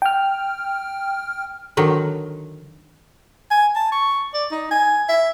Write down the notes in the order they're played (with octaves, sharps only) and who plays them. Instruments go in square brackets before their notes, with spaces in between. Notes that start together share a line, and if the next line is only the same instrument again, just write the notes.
[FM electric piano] G5 F6
[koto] D3 D#3 F#3
[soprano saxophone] G#5
A5
C#6
D5
D#4
G#5
E5